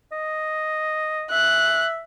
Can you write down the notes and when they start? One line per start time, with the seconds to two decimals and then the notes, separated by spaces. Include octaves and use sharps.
0.12 D#5
1.31 E5 F#6